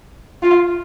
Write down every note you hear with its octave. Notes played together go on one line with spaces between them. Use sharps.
F4